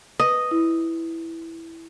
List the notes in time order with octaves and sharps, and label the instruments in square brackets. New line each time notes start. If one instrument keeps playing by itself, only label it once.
[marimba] B4 [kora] D#5
[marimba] E4